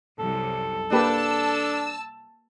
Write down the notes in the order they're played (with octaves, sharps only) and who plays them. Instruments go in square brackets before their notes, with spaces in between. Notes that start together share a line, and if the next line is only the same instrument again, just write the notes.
[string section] C2 F#2 [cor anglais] A4
[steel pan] A#3 G4 B4 [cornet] D4 [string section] A5 E6